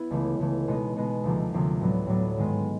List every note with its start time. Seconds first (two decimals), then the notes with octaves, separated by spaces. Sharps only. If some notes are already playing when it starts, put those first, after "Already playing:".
Already playing: B3 E4
0.11 C#2 C#3 E3 A3
0.39 C#2 C#3 E3 A3
0.68 B2 G#3 B3 D#4
0.96 B2 G#3 B3 D#4
1.24 D2 C3 F3 A#3
1.53 D2 C3 F3 A#3
1.80 A2 F#3 B3 D4
2.07 A2 F#3 B3 D4
2.38 G#2 D#3 G#3 B3